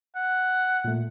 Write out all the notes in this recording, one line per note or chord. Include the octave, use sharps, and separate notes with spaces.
F#5
A#2 A3